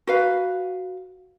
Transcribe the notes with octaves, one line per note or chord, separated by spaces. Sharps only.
F#4 B4 F5